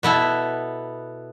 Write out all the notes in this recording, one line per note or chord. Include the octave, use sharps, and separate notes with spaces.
B2 B3 E4 A4